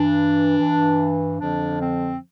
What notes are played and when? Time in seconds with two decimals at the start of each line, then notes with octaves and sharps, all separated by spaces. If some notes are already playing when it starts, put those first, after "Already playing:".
Already playing: G2 E3 D4
0.58 G2 E3
1.39 F2 D3 F3 D4
1.81 C4